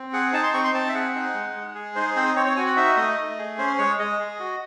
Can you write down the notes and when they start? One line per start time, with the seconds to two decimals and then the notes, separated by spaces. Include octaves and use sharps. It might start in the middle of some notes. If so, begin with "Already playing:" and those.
Already playing: C4
0.13 G#4 F#5
0.33 D#4 A5
0.43 C6
0.53 C4 C#6
0.64 C6
0.74 C4 A5
0.89 E5
0.95 G#4 F#5
1.15 D#4
1.34 G#3
1.56 G#3
1.75 G#4
1.95 D#4 C5
2.16 C4 C5
2.36 C4 C#5
2.46 C#5
2.56 F#4 G#5
2.66 F#5
2.77 D#4 E5
2.97 A3 D#5
3.18 A3
3.38 G#4
3.58 C#4 C5
3.78 G#3 C#5
3.99 G#3 D#5
4.20 G#4
4.40 F#4